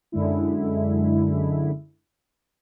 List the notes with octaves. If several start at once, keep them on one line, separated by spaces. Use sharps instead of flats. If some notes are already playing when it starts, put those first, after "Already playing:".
F#2 D3 G#3 E4